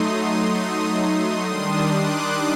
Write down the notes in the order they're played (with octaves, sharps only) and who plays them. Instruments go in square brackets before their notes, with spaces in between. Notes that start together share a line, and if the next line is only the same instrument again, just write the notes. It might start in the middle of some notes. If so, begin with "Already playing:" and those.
Already playing: [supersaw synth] F#3 A3 D#4 C6 D#6
D#3 G3 D4 C6 D#6
D6 F#6